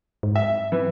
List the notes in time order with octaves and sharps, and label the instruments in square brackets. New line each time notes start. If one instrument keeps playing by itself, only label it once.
[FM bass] G#2
[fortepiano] E5
E3